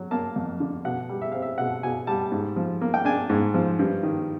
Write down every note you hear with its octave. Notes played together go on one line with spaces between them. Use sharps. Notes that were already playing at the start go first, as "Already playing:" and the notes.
Already playing: F#3
A#3 A5
F2
D3
B2 F#5
G3
E5
C4 F5
E5
B2 F#5
B2 G#5
G3 A5
G#2
F3
A#3
G5
D4 G#5
G#2
F3
G2
D#3